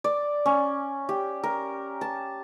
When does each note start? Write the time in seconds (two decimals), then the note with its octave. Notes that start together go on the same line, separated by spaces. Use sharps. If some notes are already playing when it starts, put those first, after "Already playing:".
0.04 D5
0.46 C#4
1.09 G4
1.43 A#4
2.01 A5